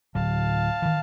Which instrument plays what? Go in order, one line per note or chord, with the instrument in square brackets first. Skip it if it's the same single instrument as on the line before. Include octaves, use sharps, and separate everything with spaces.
[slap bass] D1 F#3 [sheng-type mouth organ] F5 A5
[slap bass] D#3 E3